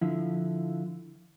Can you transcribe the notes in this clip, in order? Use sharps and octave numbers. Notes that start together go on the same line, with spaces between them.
D3 F3 E4